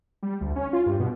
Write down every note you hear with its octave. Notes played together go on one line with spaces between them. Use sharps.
G3
D2
C#4
F4
G2
B2